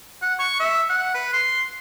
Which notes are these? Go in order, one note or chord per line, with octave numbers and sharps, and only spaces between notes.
F#5
C#6
E5
F#5
B4
C6